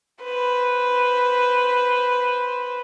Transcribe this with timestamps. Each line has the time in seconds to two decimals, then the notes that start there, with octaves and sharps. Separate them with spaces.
0.23 B4 C5